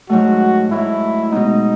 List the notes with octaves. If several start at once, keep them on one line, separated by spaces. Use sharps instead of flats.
G#2 F#3 A3 F#4
G#2 F#3 A3 E4
B2 G#3 B3 D#4